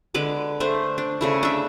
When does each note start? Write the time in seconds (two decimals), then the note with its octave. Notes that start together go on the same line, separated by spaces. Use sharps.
0.14 D3 G#3 B4 D6
0.60 A3 D4 C5
0.98 D4
1.21 C#3 A3 E4
1.43 D4 E5